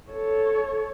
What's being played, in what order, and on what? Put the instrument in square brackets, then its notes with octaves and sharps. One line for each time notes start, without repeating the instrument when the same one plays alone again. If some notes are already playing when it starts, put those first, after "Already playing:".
[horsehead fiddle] A4 C#5